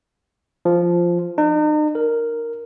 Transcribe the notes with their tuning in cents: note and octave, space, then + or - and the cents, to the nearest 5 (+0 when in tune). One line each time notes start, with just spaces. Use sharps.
F3 -5
D#4 -40
A#4 -5